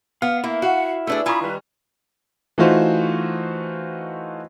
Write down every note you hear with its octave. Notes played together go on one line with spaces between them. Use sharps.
B3 F5 F6
A#3 E4 E5
F#4 F5 F#5
A3 D4 G#4 B4 D5 E5 E6
E4 F4 G#5 A#5 B5 C#6 D#6
D#3 G3 B4
E3 A3 D#4 F4 F#4 C5